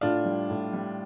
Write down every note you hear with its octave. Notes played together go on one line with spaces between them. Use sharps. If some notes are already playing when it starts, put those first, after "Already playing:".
A2 D4 F4
G3
A2
G3